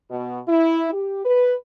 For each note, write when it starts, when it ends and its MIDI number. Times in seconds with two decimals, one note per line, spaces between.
0.11 0.40 47
0.48 0.90 64
0.92 1.23 67
1.25 1.55 71